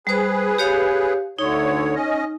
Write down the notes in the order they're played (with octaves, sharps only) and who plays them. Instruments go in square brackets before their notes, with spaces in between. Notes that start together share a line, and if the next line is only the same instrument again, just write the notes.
[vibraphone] G3 C5 [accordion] G#4 B4
[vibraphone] G4 C#5 F5
[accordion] D2 D3 C#5 [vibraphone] D#4
[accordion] C#4 D#5